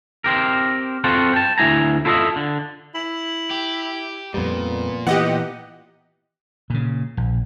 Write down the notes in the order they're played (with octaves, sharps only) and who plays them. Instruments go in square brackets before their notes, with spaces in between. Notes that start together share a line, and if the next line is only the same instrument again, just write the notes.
[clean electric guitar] C4 G4 A#4
C4 F4 F#4 A4 C5
G5 A5
D2 A#3 E4 G#5 A#5
E4 F4 A4 C5 D#5 E5
D3
[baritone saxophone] E4
[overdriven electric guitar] G4
[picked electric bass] F2 G3 [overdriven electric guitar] A#2 [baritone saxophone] B3
[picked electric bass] E3 B3 [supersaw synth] G4 D#5 F#5
[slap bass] A#2 C#3
A#1